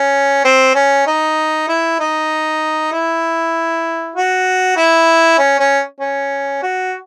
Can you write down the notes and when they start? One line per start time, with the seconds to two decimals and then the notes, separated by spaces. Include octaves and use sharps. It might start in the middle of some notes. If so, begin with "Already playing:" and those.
Already playing: C#4
0.45 C4
0.75 C#4
1.07 D#4
1.68 E4
2.00 D#4
2.92 E4
4.16 F#4
4.77 E4
5.38 C#4
5.59 C#4
6.00 C#4
6.62 F#4